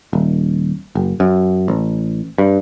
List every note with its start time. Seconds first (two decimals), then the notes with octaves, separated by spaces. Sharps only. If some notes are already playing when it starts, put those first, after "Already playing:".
0.13 D#1
0.95 F#1
1.20 F#2
1.68 A1
2.38 G2